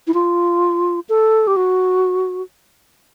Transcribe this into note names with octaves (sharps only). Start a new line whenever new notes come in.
E4
F4
A4
G4
F#4